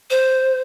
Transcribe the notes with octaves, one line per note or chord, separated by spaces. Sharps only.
C5